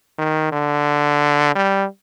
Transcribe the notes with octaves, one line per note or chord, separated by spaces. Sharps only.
D#3
D3
G3